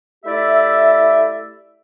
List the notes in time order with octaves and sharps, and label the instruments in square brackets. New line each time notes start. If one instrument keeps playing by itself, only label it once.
[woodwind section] A3 E4 G4 D5 E5